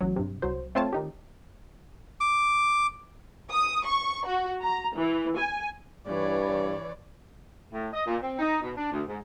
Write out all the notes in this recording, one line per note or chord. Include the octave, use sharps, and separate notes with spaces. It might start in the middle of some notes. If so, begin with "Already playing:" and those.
A1 F#3
G2 C3
C2 F#3 C5
A3 C4 F4 C#5 A5
D#3 D#4 G4
D6
D#6
C#6
F#4
A#5
E3
G#5
G2 E3 C#5 D5
A2
D#5
A#2
C4
D#4
B2
D4
D2
G#2